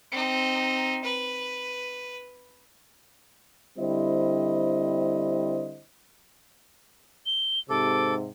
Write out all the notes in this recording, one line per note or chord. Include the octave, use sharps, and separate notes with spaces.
C4 D#4
B4
D3 G3 C4 E4 C5 D#5
G7
G#2 C3 A4 D6